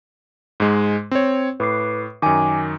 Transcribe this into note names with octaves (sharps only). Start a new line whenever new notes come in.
G#2 G#3
C4 C#5
A2 B4 D6 C7
F#2 D#3 G#5 D6